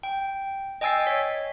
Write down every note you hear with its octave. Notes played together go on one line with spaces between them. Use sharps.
G5
D#5 G5 G#5 E6 A6 C7
C#5 B6